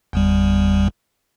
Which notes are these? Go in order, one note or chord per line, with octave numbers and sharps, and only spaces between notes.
G1 E2 G3